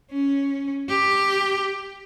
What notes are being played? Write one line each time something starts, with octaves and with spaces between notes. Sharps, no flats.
C#4
G4